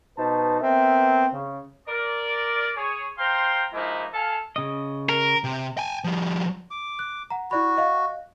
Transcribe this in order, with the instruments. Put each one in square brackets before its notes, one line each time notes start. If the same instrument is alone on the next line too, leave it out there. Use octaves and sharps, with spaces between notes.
[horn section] B2 D#4 B4 C5 A5
B3 C4 A#4 E5
C#3
A#4 D5
G#4 C#5
C5 F5 G5 A#5 C6
F3 G#3 A#3 D#4 E4
A4 F5 G#5
[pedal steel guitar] C#3 D#5
[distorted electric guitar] A#4
[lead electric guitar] C3
G5 G#5
F3 G3
[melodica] D6
[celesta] F#6
F#5 A#5
[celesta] E4 D5 B5 [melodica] F#4
[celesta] D#5 F5